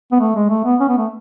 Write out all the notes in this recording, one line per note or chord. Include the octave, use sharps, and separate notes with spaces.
B3
A3
G#3
A3
B3
C#4
B3
A3